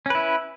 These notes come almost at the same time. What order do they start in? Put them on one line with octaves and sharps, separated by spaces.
C#4 B4 E4